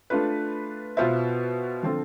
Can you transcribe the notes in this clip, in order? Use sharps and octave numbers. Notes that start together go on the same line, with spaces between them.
A3 D4 F4 B4
B2 B3 F4 C5 E5
D3 F3 C4 F4 A4